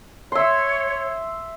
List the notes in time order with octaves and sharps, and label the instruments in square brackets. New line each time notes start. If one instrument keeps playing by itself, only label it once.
[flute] C#5 [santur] E5 C6